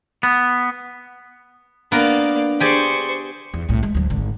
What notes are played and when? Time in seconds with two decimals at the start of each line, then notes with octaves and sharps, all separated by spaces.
0.23 B3
1.92 A#3 B3 D4 A#4 D5
2.60 G4 G#4 C5 D5 C#6
3.54 E2
3.69 C2 A2
3.83 G#3
3.95 D2 F#3
4.10 G#1 D3